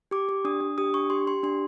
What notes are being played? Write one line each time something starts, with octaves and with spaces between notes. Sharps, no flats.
G4 D6
G4
D4 D#6
D4
G4 D#6
D4 C#6
G4 C6
G4 C6
D4 C6